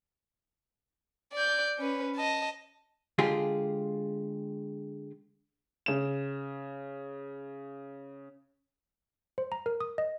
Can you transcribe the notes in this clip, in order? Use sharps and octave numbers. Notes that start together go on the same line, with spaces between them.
D5 G6
C#4 B4
D#5 A5
D3 G#3 F4 G4 G#4
C#3 E7
C5
A#5
A#4
D#6
D#5